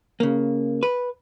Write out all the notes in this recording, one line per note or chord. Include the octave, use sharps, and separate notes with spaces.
C#3 A#3
B4